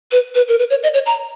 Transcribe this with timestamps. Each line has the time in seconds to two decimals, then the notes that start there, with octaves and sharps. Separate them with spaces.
0.12 B4
0.35 B4
0.48 A#4
0.59 B4
0.70 C#5
0.83 D#5
0.94 C#5
1.06 A#5